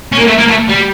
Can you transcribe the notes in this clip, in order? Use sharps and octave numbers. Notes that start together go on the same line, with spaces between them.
C#4
A#3
A3
A#3
A3
G3